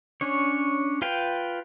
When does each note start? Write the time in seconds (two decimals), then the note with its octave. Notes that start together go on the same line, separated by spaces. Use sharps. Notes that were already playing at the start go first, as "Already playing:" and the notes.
0.21 C#4 D4 C#5
1.02 F4 B4 F5 G5